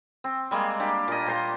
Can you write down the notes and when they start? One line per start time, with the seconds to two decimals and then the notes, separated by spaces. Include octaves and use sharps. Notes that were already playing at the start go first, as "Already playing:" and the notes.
0.24 C4
0.51 G3 G#3 A#3
0.80 A#3 D4 G4
1.08 A#2 D#5
1.27 A#2 C5 A#5 C6